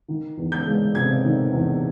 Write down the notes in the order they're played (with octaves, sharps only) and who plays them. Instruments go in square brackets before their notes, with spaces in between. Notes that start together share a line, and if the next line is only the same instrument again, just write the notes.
[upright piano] D#3
E2
G6
G#3
C3 G#6
D#3
E2